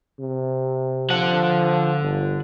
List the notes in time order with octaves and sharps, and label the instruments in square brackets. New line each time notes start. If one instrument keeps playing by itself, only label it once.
[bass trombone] C3
[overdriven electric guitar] D3 F#5 [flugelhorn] F3
[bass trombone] G1